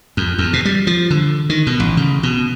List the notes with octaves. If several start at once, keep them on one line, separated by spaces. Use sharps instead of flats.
F2
E2
B2
G3
F3
D3
D#3
B2
A1
C#3
B2